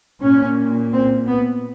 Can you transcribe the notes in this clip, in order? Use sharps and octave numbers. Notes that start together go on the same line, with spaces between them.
A#2 C#4
C4
B3